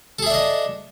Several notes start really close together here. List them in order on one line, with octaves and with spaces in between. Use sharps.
A4 G#4 E5 D4 D#5